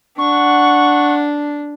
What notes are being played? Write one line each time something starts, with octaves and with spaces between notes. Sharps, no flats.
D4 F#5 C#6